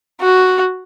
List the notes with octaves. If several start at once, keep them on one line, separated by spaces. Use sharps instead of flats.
F#4